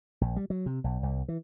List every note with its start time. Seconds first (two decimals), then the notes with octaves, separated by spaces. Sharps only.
0.21 A#1
0.36 G3
0.50 F#3
0.66 C3
0.84 B1
1.03 C2
1.28 E3